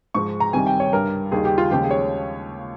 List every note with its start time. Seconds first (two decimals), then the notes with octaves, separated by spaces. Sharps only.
0.14 G#2 F3 G#3 C#6
0.40 A#5
0.53 C2 C3 D#3 G3 G#5
0.67 G5
0.80 C#5
0.93 G2 G3 A#4
1.32 D#2 D#3 G3 G#4
1.45 G4
1.58 F4
1.71 D#2 C#3 F3 G#3 G4
1.84 G#4
1.91 C#5